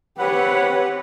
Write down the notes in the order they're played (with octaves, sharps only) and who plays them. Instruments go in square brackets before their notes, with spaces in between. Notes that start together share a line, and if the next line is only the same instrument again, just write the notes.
[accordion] C4 B4 F#5 [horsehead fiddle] G4 C#5